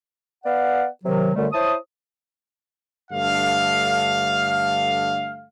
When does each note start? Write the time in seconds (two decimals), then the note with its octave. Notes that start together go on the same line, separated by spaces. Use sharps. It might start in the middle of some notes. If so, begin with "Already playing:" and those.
0.44 B3 D5 F5 F#5
1.04 C3 D#3 F#3
1.35 F#2 D3 G3 A3
1.53 E4 C5 C#5 A5 D#6
3.11 G2 D3 A3 F5